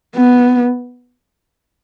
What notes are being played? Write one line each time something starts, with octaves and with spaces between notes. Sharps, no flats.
B3